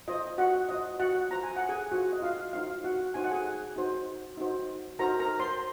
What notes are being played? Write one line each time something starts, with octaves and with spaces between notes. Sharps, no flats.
F4 C5 D#5
F#4 F#5
F4 C5 D#5
F#4 F#5
F4 C5 A#5
G#5
F#5
G#4 G#5
F4 F#4 C5 F#5
D#5
F4 F5
D#4 F4 F#4 C5 F5
F#4 F#5
D#4 F#4 C5 G#5
F#5
G#4 G#5
D#4 F#4 C5
D#4 F#4 C5
D#4 F#4 A#4 C5 A#5
A#4 A#5
C5 C6